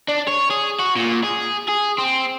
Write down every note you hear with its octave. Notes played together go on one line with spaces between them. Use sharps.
D4
C#5
G#4
F#4
A#2
G#4
G#4
C4